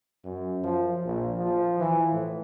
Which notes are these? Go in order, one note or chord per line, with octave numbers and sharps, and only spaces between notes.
F#2
F3
A#1
F3
E3
A2